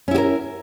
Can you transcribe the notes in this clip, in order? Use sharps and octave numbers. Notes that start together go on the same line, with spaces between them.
C#4 E4 G4 A#4